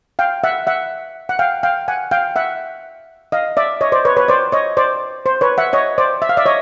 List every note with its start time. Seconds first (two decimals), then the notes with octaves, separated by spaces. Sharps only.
0.19 F5 G5
0.44 E5 F#5
0.67 E5 F#5
1.29 F#5
1.39 F5 G5
1.63 F5 G5
1.88 F#5 G#5
2.11 F5 G5
2.36 E5 F#5
3.32 D#5 F5
3.57 D5 E5
3.81 C#5 D#5
3.92 C5 D5
4.05 B4 C#5
4.17 B4 C#5
4.28 C5 D5
4.52 C#5 D#5
4.77 C5 D5
5.26 C5
5.41 B4 C#5
5.58 E5 F#5
5.73 C#5 D#5
5.98 C5 D5
6.22 E5
6.29 F5
6.37 D5 E5
6.46 C#5 D#5